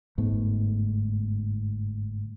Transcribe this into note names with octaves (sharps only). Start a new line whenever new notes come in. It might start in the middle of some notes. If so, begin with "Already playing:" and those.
G1 G#2 A3 B3